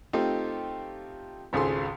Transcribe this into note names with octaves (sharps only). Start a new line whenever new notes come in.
A3 C4 D#4 F4 G4
G#1 C#2 G#4 A4 C6